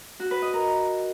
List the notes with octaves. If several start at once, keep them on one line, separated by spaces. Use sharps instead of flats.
F#4
B4
D#5
A#4